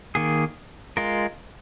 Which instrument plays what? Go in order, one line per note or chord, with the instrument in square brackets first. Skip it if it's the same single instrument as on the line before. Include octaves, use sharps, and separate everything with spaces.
[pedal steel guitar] D#3 A#3 G#4
G#3 F4 A#4